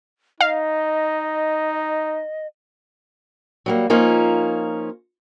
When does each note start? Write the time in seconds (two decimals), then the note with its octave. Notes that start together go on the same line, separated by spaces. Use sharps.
0.41 D#4 D#5 F5
3.66 F#3 G3 A#3
3.90 F3 A#3 C#4 D#4 F4